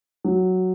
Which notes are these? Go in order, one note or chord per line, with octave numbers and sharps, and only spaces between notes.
F#3